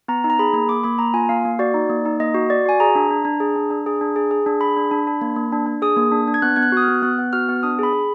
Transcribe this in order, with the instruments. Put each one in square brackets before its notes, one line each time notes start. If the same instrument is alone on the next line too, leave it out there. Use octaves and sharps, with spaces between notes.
[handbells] B3 A#5
D#4
A#5
G#4 B5
A#3 B5
A#3 D6
A#3 B5
A#3 A#5
F4 G#5
A#3 F5
A#3
F#4 D5
D#4
A#3
D#4
A#3 D#5
F#4
F#4 D5
F#4 G#5
G#4 A#5
D4
D4
D4
G#4
D4
D4
G#4
D4
G#4
G#4
D4
G#4 B5
D4
D4
D4
A#3
A#3
D4
D4
G#4 D#6
A#3
D4
D4
G#6
B3 F#6
B3 G#6
F#6
F#4 D#6
F6
B3
B3 F#6
B3
F#4 F6
B3
D4 D#6
G#4 B5
G#4